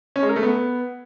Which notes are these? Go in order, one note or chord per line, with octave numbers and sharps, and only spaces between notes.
C#4
G#3
A#4
A3
B3